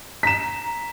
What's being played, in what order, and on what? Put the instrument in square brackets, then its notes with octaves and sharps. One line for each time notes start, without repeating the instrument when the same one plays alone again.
[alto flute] A#5 [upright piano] B6 E7